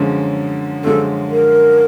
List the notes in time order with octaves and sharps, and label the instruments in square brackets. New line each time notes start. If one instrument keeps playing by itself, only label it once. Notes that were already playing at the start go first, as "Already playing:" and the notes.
Already playing: [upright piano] F#2 D3 F3 G#3 C#4
[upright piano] F#2 D3 F3 G#3 C#4 [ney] A4
[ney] A#4